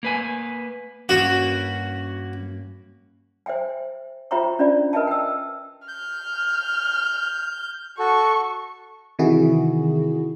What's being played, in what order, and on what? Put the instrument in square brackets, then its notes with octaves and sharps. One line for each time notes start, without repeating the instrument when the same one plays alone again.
[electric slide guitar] A#3 B4 G#5
[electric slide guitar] G2 A#3 C#4 [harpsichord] F#4
[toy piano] C5 E5 G5 G#5
F4 C5 E5 G5 A#5 C#6
C#4 D4 F4 D5
A#4 B4 D#5 E5 G#5 A5
G5 E6
[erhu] F6 [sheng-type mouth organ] G6
[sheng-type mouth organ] F#4 A4 [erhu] C#6
[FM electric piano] C3 D#3 E3 E4 F#4 G#4